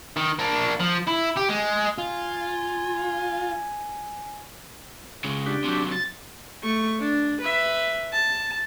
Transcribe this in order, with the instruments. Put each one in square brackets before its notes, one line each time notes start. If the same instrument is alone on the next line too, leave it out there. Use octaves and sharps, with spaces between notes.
[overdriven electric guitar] D#3
A#3 D4
F3
E4
G4
G#3
[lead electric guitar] F4 [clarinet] G#5
[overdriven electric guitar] C#3 G#3
[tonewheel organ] D4 G4
[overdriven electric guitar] C3 F#3
[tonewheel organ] A6
[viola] A3 C#6
D4
B4 E5
A5